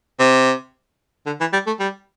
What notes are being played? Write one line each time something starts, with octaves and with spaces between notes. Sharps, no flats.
C3
D3
E3
G3
A3
G3